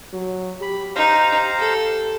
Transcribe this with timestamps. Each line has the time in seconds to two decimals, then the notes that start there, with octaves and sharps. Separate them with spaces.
0.13 F#3
0.62 G4 B5
0.96 D#4 C5 F5 A#5
1.59 A4